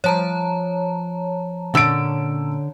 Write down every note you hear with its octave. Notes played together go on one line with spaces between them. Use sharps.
F3 C5 C#5 A5 A#5
A#2 D3 C#4 D#4 E6 D7